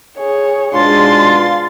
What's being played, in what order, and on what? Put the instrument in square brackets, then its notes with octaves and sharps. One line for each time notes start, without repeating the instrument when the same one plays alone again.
[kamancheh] G#4 C#5
[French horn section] G#2 B2 G#3 [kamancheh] D4 [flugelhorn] F4 [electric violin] C6 A6